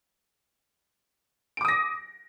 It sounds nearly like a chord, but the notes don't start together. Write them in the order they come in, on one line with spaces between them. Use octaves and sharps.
D7 D6 D#6 A#6